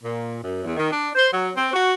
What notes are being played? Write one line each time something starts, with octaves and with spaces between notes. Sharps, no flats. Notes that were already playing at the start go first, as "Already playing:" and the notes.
A#2
F#2
E2
D#3
D4
C5
F#3
C4
F#4